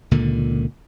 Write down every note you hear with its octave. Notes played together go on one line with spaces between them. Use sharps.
C#2 A#2 D3 D#3